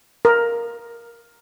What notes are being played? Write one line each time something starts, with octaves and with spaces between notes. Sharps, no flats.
A#4